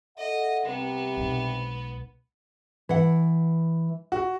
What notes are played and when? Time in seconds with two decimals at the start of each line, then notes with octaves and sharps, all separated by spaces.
0.18 A4 D#5 E5 F#5
0.65 C2 C3 B3
1.17 B1 G#3
2.89 E3 F#5
4.12 F#4